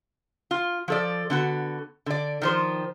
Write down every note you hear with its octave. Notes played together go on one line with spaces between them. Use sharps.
F4
F3 A4 D5
D3 B3 F#4
D3 D5
D#3 F3 C5